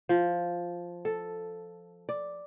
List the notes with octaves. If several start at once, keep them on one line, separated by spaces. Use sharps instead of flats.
F3
A4
D5